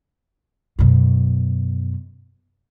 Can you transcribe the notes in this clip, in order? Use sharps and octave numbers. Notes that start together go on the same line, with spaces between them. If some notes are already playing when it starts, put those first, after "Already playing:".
F#2 B2